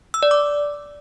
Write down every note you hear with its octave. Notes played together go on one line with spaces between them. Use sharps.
E6
D5
D6